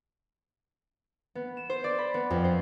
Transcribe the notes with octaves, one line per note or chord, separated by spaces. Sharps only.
B3
E7
C5
D5
B5
B3
F2
C5